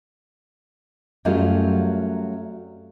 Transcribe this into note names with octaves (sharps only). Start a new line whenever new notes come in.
F#2 F#3 G3 A3 C#4 F4